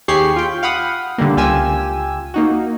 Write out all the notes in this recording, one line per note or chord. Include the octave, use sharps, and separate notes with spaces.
D#2 G4 G#4 B5 C#6 C7
F4 G5
F5 F#5 B5 D#6
D3 G3 A#3
C#2 F4 G4 G#5 E6
A#3 D#4 F#4